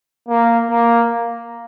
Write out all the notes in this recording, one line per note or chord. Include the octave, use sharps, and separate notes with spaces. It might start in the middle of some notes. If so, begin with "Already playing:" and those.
A#3
A#3